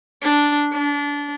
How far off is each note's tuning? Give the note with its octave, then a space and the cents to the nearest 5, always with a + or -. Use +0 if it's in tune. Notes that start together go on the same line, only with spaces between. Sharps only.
D4 -5
D4 -25